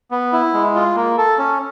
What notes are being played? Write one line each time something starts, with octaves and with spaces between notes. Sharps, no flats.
B3
E4
G#3
F4
A#3
A4
C#4